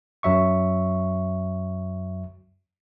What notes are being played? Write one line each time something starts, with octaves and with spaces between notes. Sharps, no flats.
F#2 F#3 E5 C#6